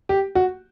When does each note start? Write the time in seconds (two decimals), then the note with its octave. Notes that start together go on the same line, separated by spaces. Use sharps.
0.09 G4
0.35 F#4